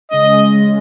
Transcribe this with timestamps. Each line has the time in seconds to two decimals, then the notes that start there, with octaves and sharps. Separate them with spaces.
0.11 C#3 G#3 C#4 D#5
0.54 C#3 G#3 C#4